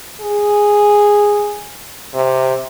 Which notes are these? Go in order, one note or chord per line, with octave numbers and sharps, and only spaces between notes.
G#4
C3